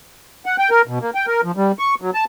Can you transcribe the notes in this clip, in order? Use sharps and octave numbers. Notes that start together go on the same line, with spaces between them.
F#5
G5
A#4
B2
A#3
G5
A#4
F3
G3
C#6
F#3
A5